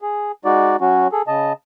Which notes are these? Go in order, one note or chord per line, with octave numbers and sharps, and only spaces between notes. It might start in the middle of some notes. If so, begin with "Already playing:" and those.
G#4
G#3 D#4 F#4 D5
F#3 C#4 F#4
G#4 A4
C#3 D#5 A5